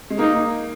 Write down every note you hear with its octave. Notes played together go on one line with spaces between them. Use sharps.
G#3
A#3 D#4